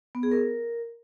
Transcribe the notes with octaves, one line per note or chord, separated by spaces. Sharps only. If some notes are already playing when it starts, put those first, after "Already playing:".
B3
G#4
A#4